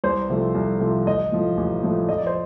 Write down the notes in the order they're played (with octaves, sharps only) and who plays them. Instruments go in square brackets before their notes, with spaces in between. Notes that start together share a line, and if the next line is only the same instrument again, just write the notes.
[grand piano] C2 C5
C3 F3 A3
C2
C3 F3 A3
A1 D#5
A2 F3 A3
A1
A2 F3 A3
F2 D#5
D5
C5